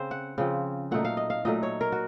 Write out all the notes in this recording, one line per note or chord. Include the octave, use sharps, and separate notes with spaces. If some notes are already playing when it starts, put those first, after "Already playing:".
Already playing: C#3 C4 C5
F#5
C#3 F3 C4
A#2 F#3 A3 D#4 F#5
F5
D#5
F5
A#2 F#3 A3 D#4 D#5
C#5
A#4
F#4